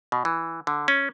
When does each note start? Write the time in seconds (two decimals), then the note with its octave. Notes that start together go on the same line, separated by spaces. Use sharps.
0.12 B2
0.25 E3
0.67 D3
0.88 C#4